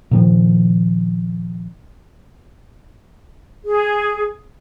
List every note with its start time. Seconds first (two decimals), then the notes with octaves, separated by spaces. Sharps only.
0.11 A#2 D#3 F3
3.65 G#4